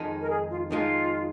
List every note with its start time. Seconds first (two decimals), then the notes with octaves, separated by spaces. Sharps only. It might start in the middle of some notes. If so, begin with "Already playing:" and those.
Already playing: F2 D#3 G#3 D#4
0.21 A#4
0.30 G#4
0.50 F4
0.71 F2 D#3 G#3 D#4 F4